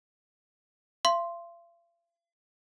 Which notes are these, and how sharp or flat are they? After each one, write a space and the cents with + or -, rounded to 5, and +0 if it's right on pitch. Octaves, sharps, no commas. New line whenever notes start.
F5 -45 C6 +0